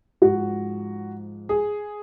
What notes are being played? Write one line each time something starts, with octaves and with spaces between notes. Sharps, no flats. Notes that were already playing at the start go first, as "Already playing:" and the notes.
G#2 F3 F#4
G#4